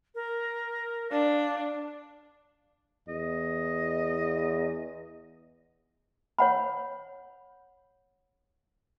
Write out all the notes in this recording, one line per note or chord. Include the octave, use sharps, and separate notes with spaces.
A#4
D4 F5
E2 D#5
C#5 F#5 B5